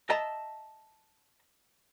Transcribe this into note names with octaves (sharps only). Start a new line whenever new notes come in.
D#5 E5 A5 A#5